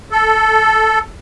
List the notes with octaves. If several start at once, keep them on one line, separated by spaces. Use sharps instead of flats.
A4